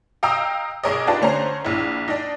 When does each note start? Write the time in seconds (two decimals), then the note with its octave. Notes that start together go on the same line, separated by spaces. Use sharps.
0.23 D#5 F5 G5 A#5 D#6 E6
0.84 B1 G#4 A#4 C#5 D#5
1.07 D4 D#4 F4 G4 B4 A5
1.21 D3 A3 C#4 C5 A#5 C7
1.65 A#1 E4
2.08 D4 D#4